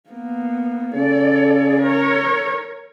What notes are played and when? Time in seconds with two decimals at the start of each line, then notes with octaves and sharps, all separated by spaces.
0.10 A#3 B3
0.95 C#3 A4 D5
1.82 A#4 C#5